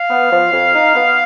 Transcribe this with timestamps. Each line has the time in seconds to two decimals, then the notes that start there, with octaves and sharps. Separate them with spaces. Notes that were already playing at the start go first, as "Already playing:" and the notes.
Already playing: F5
0.10 B3
0.30 F3
0.52 F2
0.73 D#4
0.94 B3